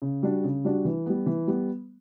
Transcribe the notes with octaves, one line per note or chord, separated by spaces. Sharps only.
C#3
G3 D4 F#4
C#3
G3 D4 F#4
E3
G3 B3
E3
G3 B3